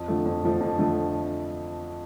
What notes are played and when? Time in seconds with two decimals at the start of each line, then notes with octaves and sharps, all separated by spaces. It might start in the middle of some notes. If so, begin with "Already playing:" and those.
Already playing: F2
0.08 D3 F3 A3
0.26 F2
0.43 D3 F3 A3
0.60 F2
0.78 D3 F3 A3